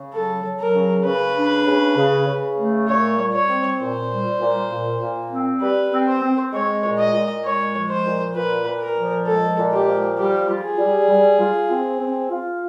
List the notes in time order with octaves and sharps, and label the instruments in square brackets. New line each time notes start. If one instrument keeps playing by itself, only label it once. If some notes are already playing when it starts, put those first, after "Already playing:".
Already playing: [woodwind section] C#3
[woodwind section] F#3 [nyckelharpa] A4
[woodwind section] F#3
[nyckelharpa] A#4
[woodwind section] C#3
[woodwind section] C#3 [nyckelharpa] B4
[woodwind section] D4
C#3
C#3
C#3
A3
[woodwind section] A#2 [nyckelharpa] C#5
[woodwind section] G3
[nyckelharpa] C#5
[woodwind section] C4
[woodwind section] A#2 [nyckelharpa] C5
[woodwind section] G3
A#2
A#2
A#2
C4
[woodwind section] G3 [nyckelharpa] B4
[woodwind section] C4
[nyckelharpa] C5
[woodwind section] C4
[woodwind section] G#3 [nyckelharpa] C#5
[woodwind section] A#2
[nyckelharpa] D#5
[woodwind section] A#2
[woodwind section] G#3 [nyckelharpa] C#5
[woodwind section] F3
[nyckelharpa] C5
[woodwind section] A#2
[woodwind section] A#2 [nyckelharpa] B4
[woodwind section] A#2
[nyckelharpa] A#4
[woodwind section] F3
[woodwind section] G#3 [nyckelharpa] A4
[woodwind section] A#2
[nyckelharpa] G4
[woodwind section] F3
[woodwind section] G3 [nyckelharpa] G4
[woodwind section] F4
[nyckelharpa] G#4
[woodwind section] G3
G3
F4
C4
C4
F4